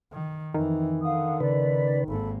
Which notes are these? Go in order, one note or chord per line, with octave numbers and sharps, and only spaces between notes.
D#3
F2 D#3 E3
D3 F5 F#5 D#6
C#3 B4 D5
G#1 A#3 A4 B5